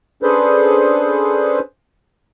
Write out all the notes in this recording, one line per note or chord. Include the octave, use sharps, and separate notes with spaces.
C#4 D4 G#4 A4 B4 C5